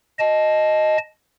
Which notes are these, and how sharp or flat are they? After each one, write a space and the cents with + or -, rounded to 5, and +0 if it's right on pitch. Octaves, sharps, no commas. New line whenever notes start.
D#5 +0 A5 -20